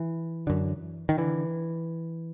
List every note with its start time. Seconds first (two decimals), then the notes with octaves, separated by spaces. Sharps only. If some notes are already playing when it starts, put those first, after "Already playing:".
Already playing: E3
0.47 F#2 D3
1.09 D#3
1.18 D3 E3